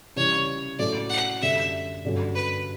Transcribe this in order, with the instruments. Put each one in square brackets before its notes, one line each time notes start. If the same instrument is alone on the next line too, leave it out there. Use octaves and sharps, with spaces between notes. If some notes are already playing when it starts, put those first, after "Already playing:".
[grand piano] C#3 E3 G3 [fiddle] C#5
[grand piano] A2 F#3 A3 C#4 [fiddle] D5
[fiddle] F#5
[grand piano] F#2 D3 G3 C#4 [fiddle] E5
[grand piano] G2 D3 F#3 C#4 F#4
[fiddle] B4